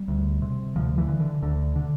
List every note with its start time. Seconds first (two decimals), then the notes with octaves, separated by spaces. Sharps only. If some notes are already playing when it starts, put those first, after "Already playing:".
Already playing: G3
0.08 D2
0.42 C3
0.76 D2 F3
0.98 E3
1.09 D3
1.20 D3
1.42 D2 D3
1.76 D3